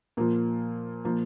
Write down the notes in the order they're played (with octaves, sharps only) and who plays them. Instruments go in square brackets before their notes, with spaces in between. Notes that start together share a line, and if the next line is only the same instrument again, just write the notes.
[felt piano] A#2 F3 A#3
A#2 F3 A#3